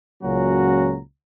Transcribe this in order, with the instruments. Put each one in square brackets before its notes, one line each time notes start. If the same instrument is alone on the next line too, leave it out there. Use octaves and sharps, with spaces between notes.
[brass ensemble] C#2 A#2 F#3 C#4 F#4 A#5